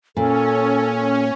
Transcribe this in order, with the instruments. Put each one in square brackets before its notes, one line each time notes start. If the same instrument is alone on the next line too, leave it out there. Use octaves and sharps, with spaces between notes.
[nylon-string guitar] A#2 [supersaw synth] C#4 [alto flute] A4